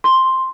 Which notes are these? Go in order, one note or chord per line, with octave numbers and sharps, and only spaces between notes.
C6